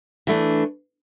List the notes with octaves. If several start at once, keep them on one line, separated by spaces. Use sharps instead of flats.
E3 A3 D4